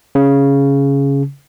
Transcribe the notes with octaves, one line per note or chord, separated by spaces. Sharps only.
C#3